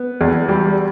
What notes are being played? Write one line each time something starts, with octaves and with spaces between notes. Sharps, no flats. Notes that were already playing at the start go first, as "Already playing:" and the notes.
Already playing: B3
E2
G3